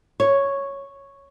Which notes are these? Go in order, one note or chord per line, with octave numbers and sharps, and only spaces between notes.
C#5